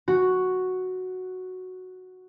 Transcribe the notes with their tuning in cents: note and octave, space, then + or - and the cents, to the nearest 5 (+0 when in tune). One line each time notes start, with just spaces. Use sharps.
F#4 +0